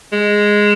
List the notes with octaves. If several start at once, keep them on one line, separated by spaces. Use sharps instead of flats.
G#3